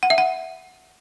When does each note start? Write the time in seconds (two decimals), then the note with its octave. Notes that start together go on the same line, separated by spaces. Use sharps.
0.03 F#5
0.10 E5
0.18 F#5